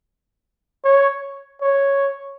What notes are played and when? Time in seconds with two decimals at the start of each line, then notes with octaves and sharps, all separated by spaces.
0.85 C#5
1.62 C#5